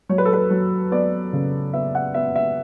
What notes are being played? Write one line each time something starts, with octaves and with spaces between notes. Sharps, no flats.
F#3 C#5
B4
A4
B4
F#3
B3 D5
C#3
B3 E5
F#5
B3 E5
E5